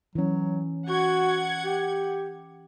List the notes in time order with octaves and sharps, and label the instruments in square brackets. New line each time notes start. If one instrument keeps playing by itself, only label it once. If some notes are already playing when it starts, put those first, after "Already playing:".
[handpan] E3 C#4 [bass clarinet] F#3
[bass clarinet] F#4 [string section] F#5 G#6
[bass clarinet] G4